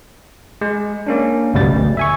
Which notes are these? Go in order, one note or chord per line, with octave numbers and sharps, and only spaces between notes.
G#3
A#3 C#4 D4
G1 C#2 F#2 B2 G3 A6
D2
E5 G#5 C#6